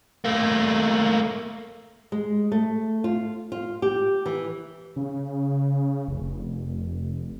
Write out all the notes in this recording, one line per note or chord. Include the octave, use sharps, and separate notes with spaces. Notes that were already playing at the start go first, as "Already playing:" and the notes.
A3 A#3
G#3
A3
F4
F4
G4
E3
C#3
F1